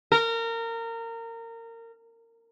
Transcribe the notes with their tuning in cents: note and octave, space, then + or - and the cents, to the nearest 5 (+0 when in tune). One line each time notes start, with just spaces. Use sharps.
A#4 -25